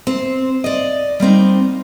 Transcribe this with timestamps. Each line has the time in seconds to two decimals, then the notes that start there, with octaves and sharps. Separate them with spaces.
0.07 C4
0.64 D5 D#5
1.20 G3 A#3 C4 D#4